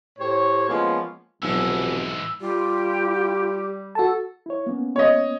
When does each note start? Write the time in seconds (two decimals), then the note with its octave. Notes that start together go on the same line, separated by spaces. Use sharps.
0.19 A2 G4 C5 C#5
0.69 F3 G#3 A#3 B3 C#4 F4
1.42 F1 B1 G#2 E3 E6
2.41 G3 F4 G4
3.95 F#4 A4 A5
4.46 E4 C#5
4.66 A#3 B3 C#4
4.96 C#5 D#5